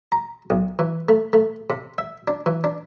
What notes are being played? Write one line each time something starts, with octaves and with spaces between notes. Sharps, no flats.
A#5
B1
E3
A3
A3
C3
E5
D4
E3
D4